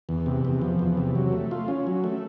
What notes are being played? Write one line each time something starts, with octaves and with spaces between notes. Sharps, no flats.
E2
C3
E2
F3
E2
C3
F#3
A3
F4
C#4
F#3
A3